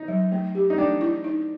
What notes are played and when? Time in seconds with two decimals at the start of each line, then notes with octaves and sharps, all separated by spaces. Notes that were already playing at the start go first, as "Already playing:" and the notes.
Already playing: D#4
0.08 F#3
0.32 A3
0.55 G4
0.70 D#4
0.78 A3 D4
1.01 E4
1.24 D#4